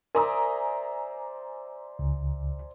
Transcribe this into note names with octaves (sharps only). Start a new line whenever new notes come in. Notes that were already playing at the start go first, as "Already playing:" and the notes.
A#4 C5 D5 E5 G#5 A#5 D#6
C#2